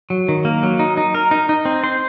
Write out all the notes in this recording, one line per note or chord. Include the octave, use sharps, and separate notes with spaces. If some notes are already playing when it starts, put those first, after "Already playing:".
F#3
D#3
A#3
F#3
D#4
D#4
A#4
D#4
D#4
C4
C5